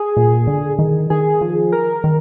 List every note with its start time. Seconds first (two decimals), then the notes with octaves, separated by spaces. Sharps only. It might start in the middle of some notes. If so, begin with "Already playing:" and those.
Already playing: G#4
0.17 A#2
0.47 D3
0.79 D#3
1.10 D#3 G#4
1.41 F3
1.72 A#4
2.04 D#3